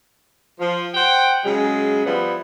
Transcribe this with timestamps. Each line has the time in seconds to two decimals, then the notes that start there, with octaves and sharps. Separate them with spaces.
0.59 F3
0.94 C5 F#5 G5
1.44 C#3 F#3 G#3 G#4
2.05 F3 G3 B3 E4